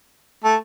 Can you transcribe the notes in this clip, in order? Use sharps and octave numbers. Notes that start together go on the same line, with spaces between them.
A3